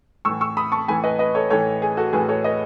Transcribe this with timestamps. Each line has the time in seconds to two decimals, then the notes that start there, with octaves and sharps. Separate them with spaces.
0.25 A2 E3 C#6 E6
0.41 C#6 E6
0.57 B5 D#6
0.72 A5 C#6
0.88 A2 E3 G#5 B5
1.04 B4 D#5
1.19 B4 D#5
1.35 A4 C#5
1.50 A2 E3 A4 C#5
1.82 G#4
1.97 F#4 A4
2.13 A2 E3 G#4 B4
2.28 A4 C#5
2.44 B4 D#5